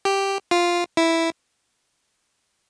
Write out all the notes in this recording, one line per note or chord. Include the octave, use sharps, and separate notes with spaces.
G4
F4
E4